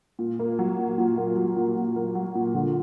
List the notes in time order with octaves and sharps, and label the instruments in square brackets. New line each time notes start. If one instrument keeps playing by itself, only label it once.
[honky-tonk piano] A#2
A#3
F#3
A#2
A#2
A#3
F#3
A#2
A#2
A#3
F#3
A#2
D3